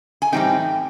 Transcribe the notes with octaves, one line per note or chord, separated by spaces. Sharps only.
G#5
A2 E3 G3 C4 D#4 G5